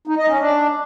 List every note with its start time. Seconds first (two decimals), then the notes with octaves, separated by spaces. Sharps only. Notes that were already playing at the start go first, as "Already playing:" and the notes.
0.07 D#4
0.18 D#5
0.29 C#4
0.40 D4